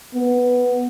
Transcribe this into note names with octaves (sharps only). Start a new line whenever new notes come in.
B3